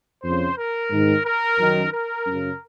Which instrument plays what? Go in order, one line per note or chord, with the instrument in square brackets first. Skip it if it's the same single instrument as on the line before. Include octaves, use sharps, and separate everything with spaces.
[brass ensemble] F2 C#3 C5
A#4
G#2 D#3
A#4
F#2 D#3
A#4
F#2 C#3